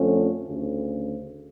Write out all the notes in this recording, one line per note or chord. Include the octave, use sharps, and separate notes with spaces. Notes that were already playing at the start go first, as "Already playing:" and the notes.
Already playing: F2 D3 F3 A3 C#4
D2 C#3